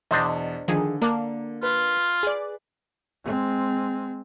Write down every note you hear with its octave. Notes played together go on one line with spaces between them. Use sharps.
E2 B2 D4 C5 D#5
D3 D#3 F3 G#4
A#3 D4
F4 B4
G#4 D5
G#3 C4